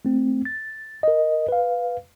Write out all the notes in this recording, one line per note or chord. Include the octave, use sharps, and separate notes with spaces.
A3 C4
A6
A#4 D#5
B4 F5